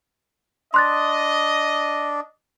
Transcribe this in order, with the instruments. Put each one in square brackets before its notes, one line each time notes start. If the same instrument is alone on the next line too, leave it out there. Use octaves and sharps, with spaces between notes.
[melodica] D4 [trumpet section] D#5 [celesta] C6 F#6 A6